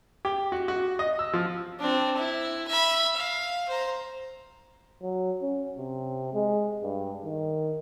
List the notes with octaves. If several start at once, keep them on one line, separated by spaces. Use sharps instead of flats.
G4
F#4
F#4
D#5
E6
F3
C4 D4
E4
E5 B5
F5
C5 A#5
F#3
C#4
C3
G#3
G2
D#3